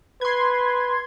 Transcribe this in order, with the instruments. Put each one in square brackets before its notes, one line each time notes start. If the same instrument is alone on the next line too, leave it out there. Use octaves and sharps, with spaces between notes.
[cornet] B4 [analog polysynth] C6 G#6